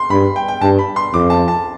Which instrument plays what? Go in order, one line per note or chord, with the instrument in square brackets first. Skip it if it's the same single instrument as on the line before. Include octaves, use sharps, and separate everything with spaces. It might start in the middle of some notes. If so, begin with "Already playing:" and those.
Already playing: [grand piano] C6
[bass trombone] G2 [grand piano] B5
[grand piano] G5
G5
[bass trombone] G2 [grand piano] A5
[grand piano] B5
C6
[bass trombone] F2 [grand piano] D6
[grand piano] A5
A5